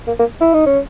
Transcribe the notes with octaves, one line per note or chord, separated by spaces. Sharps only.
A#3
A#3
E4
D#4
C#4